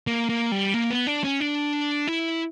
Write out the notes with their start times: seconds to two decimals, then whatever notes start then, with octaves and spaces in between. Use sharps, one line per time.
0.07 A#3
0.29 A#3
0.52 G3
0.74 A#3
0.91 B3
1.07 D4
1.24 C#4
1.40 D4
2.07 E4